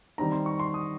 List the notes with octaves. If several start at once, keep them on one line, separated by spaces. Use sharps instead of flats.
D#3 G3 C4 D#4 A#5
C6
C#6
C6
D#6